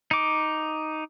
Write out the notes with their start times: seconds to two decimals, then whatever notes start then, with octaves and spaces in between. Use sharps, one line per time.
0.11 D#4 D6